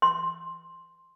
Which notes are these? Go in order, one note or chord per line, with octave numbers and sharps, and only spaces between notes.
C6